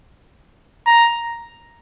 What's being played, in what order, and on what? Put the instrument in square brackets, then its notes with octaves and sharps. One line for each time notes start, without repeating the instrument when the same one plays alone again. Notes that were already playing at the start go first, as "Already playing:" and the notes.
[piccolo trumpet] A#5